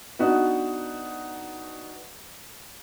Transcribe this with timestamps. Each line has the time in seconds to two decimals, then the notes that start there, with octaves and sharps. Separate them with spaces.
0.19 B3 D4 D#4 F#4